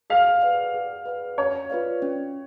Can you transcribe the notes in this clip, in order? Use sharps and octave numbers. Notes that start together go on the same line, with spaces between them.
G#4 F5
B4 D5 F#5
G#4
B4 D5 F#5
C#4 C#5
F4 B4 D5 F5
C#4